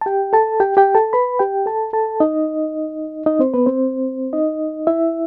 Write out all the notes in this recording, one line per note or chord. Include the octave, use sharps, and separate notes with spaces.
A5
G4 G5
A4 A5
G4 G5
G4 G5
A4 A5
B4 B5
G4 G5
A4 A5
A4 A5
D#4 D#5
D#4 D#5
C4 C5
B3 B4
C4 C5
D#4 D#5
E4 E5